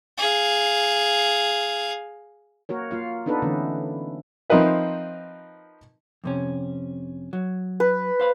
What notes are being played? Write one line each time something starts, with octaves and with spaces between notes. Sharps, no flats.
G#4 F5
A#3 F#4 A#4 C#5
A#3 F4 F5
B3 D4 D#4 A4 B4
D3 E3 A3 B3 C#4
F3 C4 D#4 A#4 B4 E5
F2 C3 C#4
F#3
B4
C5 F5 B5